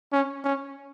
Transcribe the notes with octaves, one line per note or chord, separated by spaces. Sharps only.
C#4
C#4